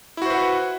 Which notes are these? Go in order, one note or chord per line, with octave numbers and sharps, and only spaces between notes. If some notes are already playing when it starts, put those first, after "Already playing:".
E4 F#4 B4 C5 F#5